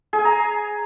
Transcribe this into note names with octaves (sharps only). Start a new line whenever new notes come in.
G#4
G#5
A#5